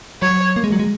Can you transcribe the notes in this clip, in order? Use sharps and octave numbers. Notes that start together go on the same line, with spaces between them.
F#3 C#5
A#3
G#3
F#3
G#3